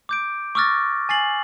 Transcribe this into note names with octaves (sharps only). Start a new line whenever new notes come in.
D6 G6 D7
C#6 D6 E6 F6 A6 A#6
G#5 A6 C7 F#7